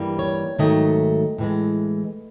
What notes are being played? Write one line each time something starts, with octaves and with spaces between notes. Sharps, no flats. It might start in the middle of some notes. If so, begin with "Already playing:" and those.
Already playing: G2 E3 G3 A#3
C#5
G#2 D#3 F#3 A3 D#5
A2 E3 G#3